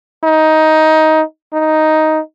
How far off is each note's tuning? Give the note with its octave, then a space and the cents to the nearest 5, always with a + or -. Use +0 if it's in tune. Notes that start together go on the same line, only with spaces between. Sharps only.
D#4 +15
D#4 +5